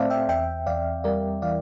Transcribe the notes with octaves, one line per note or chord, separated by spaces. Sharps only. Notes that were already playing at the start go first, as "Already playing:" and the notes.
Already playing: A2 A3 C4 C5 D5 E5 F5 A5
E5 G5
E2 E5 G5
E2 D5 F5
G3 A#4 D5
E3 D5 F5